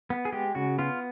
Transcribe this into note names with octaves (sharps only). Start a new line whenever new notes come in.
B3
G#4
G#3 G4
C#3 F#4
B3 F4